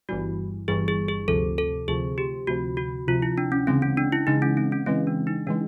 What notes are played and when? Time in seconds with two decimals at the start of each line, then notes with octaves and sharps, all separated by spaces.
0.09 G1 G2 E3 G3 F#4
0.68 G1 G2 E3 G3 G#4
0.88 G#4
1.09 G#4
1.28 D2 C3 F3 A4
1.58 A4
1.88 D2 C3 F3 G#4
2.18 G4
2.47 D2 C3 F3 F#4
2.77 F#4
3.08 D2 C3 F3 F4
3.22 E4
3.38 D4
3.52 C#4
3.67 C#3 E3 G#3 C4
3.82 C#4
3.97 D4
4.12 E4
4.27 C#3 E3 G#3 D#4
4.42 C#4
4.57 C4
4.72 C#4
4.86 C#3 E3 G#3 C4
5.07 D4
5.27 D#4
5.47 C#3 E3 G#3 D4